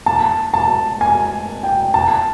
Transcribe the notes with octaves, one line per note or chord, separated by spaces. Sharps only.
A5
A5
G#5
G5
A5